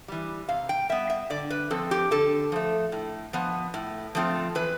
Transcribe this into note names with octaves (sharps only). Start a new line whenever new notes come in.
E3 G3
C3 F5
G5
G3 B3 E5
E5
D3 D5
B4
F3 C4 A4
G4
D3 A4
F3 A3
A2
F3 B3
A2
F3 A3 C4 F4
E3 B4